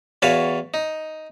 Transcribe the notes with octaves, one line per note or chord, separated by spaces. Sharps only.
E2 F#4 B4 C#5 F5 A5
D#4